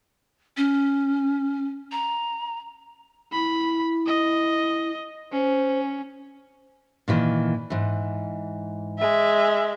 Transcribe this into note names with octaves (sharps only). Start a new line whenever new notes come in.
C#4
A#5
E4 B5
D#5
C#4 C5
A#2 D#3 E3
G#2 E3
G#3 E5